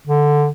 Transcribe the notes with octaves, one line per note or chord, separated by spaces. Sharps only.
D3